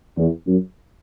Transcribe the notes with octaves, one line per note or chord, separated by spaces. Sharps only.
E2
F#2